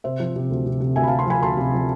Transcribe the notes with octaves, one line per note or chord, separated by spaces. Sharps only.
C3 C5 E5
F3
C3
D2
C3
C3
D2 E5 G#5
B5
F5 A5
C3
A5 C6
F3 G#5 B5
D2 A5 C6
C3
F3